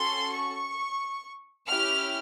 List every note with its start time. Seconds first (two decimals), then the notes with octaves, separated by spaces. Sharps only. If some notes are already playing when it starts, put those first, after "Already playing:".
Already playing: C#4 F#4 A4 C6
0.32 C#6
1.69 C#4 E4 G4 F6